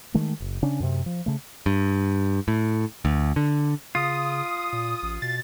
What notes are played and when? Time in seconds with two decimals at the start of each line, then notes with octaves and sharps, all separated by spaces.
0.14 D#3 G#3 A3
0.40 F#1
0.62 C#3 C#4 D4
0.80 F#2 C3
1.06 F3
1.26 C#3 A3
1.66 G2
2.48 A2
3.05 D2
3.36 D3
3.95 C#3 F4 D#6
4.73 A#2
5.03 A1
5.22 B2 A6